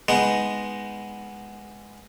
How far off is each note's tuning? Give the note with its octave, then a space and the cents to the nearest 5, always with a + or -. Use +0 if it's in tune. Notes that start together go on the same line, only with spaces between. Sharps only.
G#3 +0 B3 +0 D#4 +0